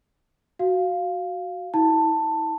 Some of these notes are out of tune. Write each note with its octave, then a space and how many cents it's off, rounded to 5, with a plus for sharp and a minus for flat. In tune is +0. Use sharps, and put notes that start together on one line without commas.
F#4 +0 F5 +0
E4 -40 A5 +15